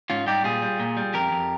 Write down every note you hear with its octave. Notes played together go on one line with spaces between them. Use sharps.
G#2 C#4 F4
G3 D#4 G4
A#2 F4 G#4
G3
A#2
G3
F2 G4 A#4
F2